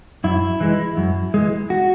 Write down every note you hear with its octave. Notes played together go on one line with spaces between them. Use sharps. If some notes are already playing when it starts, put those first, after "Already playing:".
F#2 E4
E3 G#3
F#2
E3 G#3
F#4